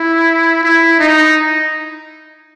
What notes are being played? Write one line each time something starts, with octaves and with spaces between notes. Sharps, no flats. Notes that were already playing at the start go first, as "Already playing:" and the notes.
Already playing: E4
E4
D#4